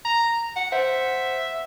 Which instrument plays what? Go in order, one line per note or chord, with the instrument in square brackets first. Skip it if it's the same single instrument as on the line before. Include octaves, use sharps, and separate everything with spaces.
[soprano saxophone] A#5
F#5
[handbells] C5 F#5 [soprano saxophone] E5